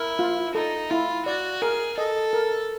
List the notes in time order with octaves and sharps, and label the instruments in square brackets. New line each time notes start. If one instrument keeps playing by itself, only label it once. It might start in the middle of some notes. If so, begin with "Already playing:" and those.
Already playing: [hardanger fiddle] E4 [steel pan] A#4
[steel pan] F4
[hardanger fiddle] D#4 [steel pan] A4
[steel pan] E4 [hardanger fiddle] F4
[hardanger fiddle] F#4 [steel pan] D5
[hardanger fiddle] G#4 [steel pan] A#4
[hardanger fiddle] A4 [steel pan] D#5
[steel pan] A#4